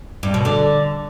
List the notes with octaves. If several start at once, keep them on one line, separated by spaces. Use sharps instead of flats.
G2
B2
D3